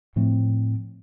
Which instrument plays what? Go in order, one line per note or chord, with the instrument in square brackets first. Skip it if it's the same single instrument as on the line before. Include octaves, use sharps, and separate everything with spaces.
[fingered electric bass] A2 F3 A3 C4